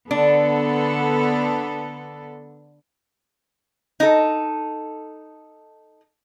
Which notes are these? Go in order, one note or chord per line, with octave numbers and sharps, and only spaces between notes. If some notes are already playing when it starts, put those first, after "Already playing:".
D3 B3 D4 A4
D#4 A4